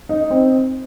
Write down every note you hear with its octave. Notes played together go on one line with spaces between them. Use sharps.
D#4
C4